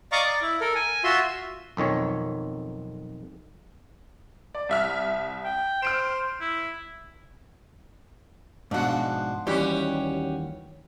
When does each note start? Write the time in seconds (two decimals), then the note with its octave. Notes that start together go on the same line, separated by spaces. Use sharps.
0.12 D5 D#5 F5 A#5 C#6 D6
0.25 D5
0.42 E4
0.61 A4 A#4
0.75 G#5
1.04 F4 F#4 E5 C6
1.77 B1 F2 D#3 C#5
4.55 D5
4.69 C2 E5 F6
5.45 G5
5.82 C5 F6 D7 E7
6.41 E4
8.71 G#2 B2 F3 D4 F#4
9.47 D#2 E3 G3 C#4 F#4 G4